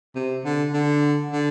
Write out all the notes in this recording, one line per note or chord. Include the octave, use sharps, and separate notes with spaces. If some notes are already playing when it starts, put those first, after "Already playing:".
C3
D3
D3
D3